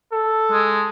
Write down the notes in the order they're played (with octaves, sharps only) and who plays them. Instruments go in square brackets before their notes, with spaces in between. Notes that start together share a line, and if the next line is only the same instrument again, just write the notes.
[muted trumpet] A4
[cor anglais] G#3